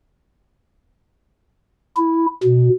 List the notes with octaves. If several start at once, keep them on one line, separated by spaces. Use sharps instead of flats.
E4
B2